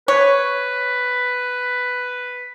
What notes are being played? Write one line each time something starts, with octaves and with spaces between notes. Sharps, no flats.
B4 C#5